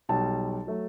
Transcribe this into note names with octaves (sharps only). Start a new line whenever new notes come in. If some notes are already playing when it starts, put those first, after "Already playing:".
B1 B2 G3 A5
F#3 A3